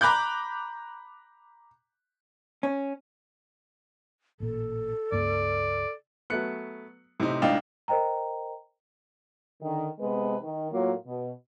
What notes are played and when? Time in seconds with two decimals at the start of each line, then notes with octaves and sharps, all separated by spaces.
0.01 A#5 B5 D6 F#6 G6
2.63 C#4
4.40 A1 A#2 A4
5.12 C#2 G2 A#3 D5
6.30 F#3 A3 B3 F#6 C#7
7.20 A2 C3 D#4 C5
7.42 C#2 A2 D4 D#4 F5 G5
7.88 A#4 C5 D#5 G5 A#5
9.62 D3 D#3
10.00 C3 G#3 B3 B4
10.42 D#3
10.72 A2 F#3 A#3 F4
11.06 B2